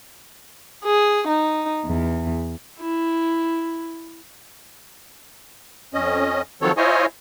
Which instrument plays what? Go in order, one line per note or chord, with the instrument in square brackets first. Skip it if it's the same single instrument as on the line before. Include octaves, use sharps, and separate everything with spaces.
[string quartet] G#4
D#4
E2
[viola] E4
[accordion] F2 C#4 D#5
D#3 F3 F#3 C4 A4 C#5
E4 F4 C5 C#5 D#5 G#5